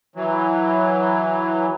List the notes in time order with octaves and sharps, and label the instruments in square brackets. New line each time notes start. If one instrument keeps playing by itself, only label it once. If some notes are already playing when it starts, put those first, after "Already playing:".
[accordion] E3 F#3